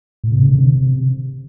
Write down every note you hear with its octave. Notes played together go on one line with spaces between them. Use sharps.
A2
C3
C#3
D3
C3